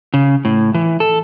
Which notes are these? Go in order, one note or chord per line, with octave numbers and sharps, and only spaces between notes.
C#3
A2
E3
A4